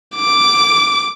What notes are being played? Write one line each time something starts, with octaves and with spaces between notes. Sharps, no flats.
D6